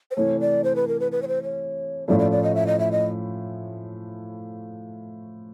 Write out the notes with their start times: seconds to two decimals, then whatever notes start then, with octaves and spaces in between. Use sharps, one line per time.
0.11 C5
0.16 C3 E3 A3 C#5
0.40 D5
0.64 C5
0.76 B4
0.88 A#4
1.00 B4
1.12 B4
1.22 C#5
1.28 C5
1.43 C#5
2.07 A2 F3 A3 C#4 E4 D5
2.19 D5
2.31 D5
2.43 D#5
2.55 E5
2.67 D#5
2.79 E5
2.92 D#5